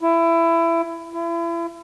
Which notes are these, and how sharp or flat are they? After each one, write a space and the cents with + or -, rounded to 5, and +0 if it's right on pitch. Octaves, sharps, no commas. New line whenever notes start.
E4 +20
E4 +35